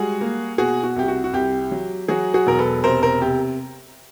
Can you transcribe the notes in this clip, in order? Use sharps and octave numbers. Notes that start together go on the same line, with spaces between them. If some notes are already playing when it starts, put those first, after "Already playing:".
Already playing: G3 G#3 F#4 G#4
A#3
B2 F#4 G#4
F#4
C2 G4
F#4
F#4
C2 G4
F#3
F#3 F#4 G#4
F#4 G#4
E1 A#4
A4 B4
C3 A#4 C5
A#4 C5
C3 G4